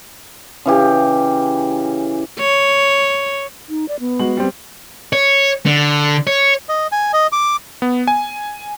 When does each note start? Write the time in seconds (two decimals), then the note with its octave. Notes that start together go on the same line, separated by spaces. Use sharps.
0.66 C#3 E3 G4
2.39 C#5
3.69 D#4
3.88 D5
4.00 B3
4.19 G#3 F#4 F#7
4.37 G3 C4
5.13 C#5
5.66 D3
6.27 C#5
6.69 D#5
6.92 G#5
7.13 D#5
7.32 D6
7.82 B3
8.07 G#5